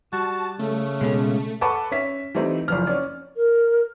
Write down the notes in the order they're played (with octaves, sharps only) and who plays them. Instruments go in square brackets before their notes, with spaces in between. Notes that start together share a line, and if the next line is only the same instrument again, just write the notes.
[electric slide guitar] G3 [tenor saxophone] F#4 [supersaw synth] A5
[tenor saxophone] C#3 [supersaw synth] A3
[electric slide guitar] B2 [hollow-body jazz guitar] G#3 C#4
[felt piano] A4 B4 F#5 A5 C#6 D6
C#4 E5 B6
E3 G3 A3 C4 D#4
F#1 F3 F6
C#4 D5
[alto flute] A#4